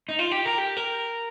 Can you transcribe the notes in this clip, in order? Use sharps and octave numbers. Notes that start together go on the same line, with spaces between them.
D#4
F4
G4
A#4
G4
A#4